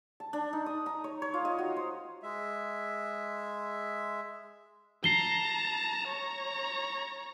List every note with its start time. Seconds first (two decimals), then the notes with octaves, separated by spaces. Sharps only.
0.20 A5
0.33 D4
0.53 D#4
0.66 D#6
0.86 A#5
1.04 C#5
1.22 C#5
1.34 F4
1.45 D#5
1.58 F#4
1.76 C5
2.23 G#3 E5
5.04 A5 A#5 C7 G7
6.08 C#5 A#5